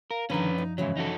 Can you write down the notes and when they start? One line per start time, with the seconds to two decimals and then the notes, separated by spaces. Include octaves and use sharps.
0.11 A#4 F5
0.30 F#2 D3 D#3 F3 C#4 B4 A#5
0.58 D#4
0.78 G#2 C#3 E3 F#3 E4 C#5
0.97 D#4 F#4 A4